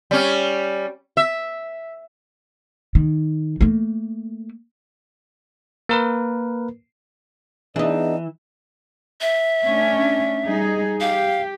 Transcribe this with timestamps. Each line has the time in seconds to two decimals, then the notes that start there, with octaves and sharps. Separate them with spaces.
0.11 G3 C#4
1.17 E5
2.95 D#3
3.61 A3 A#3
5.89 A#3 A#4 B4
7.76 E3 B3 D4 D#4 G#4 D#5
9.21 E5
9.64 A3 C#4 D4
10.46 G3 D#4 G#4
11.01 G4 F5